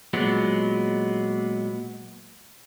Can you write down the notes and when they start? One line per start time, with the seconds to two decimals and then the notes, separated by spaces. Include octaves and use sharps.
0.13 A#2 F#3 G#3 B3